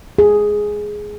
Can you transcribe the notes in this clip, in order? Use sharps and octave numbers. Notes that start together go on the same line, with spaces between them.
G#4